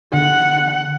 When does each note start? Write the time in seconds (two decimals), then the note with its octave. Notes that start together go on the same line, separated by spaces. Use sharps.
0.14 D3 F#5